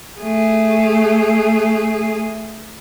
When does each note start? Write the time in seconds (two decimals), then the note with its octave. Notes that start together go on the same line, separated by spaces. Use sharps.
0.20 A3 G#4